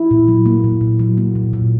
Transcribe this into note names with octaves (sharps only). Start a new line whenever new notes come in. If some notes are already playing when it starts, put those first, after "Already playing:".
Already playing: E4
A#2
F#3
A#3
A#2
A#2
F#3
A#3
A#2
A#2